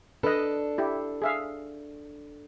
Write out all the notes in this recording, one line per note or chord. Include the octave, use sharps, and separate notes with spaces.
D4 A4 B4 D#5
E4 G4
G#4 E5 F5